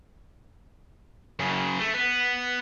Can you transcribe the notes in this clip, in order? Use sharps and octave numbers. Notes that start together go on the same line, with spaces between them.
F#2 C#3
A3
B3